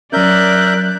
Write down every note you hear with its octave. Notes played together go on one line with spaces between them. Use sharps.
F#3 C#4 A#4 D5 E5 F#6 G6